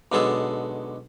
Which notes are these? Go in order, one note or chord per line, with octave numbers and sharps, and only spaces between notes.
B1 D3 G#3 B3 G#4 A4